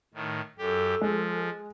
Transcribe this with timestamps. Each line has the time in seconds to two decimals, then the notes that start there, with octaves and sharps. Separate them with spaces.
0.14 A2 D#3
0.58 F#2 G4 A4
1.01 F3 G#3